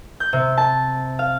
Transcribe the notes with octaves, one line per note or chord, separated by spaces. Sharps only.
G6
C3
A5
F5